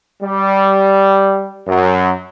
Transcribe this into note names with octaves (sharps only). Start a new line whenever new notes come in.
G3
F#2